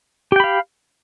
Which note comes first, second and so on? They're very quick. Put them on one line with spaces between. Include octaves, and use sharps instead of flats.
G4 G5 B5 F5